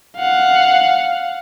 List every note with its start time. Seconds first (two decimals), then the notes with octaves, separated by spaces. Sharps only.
0.17 F5 F#5